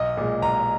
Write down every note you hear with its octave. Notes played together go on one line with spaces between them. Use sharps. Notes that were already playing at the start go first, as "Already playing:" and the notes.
Already playing: B1 D#5
A#2 G#3
B1 A#5